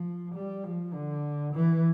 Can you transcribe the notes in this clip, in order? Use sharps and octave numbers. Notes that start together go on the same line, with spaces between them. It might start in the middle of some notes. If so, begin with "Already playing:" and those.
Already playing: F3
G3
F3
D3
E3